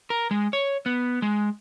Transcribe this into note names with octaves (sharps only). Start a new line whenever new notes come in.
A#4
G#3
C#5
B3
G#3